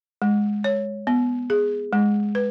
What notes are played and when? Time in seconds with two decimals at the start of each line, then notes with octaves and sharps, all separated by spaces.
0.22 G#3
0.64 C#5
1.07 B3
1.50 G#4
1.93 G#3
2.35 B4